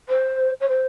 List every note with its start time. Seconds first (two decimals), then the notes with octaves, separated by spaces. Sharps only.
0.09 C5
0.60 C#5
0.68 C5